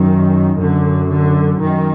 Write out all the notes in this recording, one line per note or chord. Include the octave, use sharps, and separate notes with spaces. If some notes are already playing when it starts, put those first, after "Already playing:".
Already playing: F#2 D#3
F#2 D3
D3
F#2 D#3